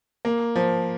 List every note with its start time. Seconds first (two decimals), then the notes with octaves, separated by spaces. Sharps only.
0.25 A#3
0.56 F3